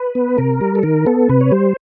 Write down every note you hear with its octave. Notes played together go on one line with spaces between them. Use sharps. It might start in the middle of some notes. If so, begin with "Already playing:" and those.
Already playing: B4
B3
C3 A#4
G3
A4
D#3 A#4
B3 A4
C3 B4
C#5
G3 C5